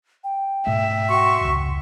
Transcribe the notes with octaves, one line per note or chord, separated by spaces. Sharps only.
G5
G#2 B2 A3 E5
F#4 C6 C#6
F1 C#2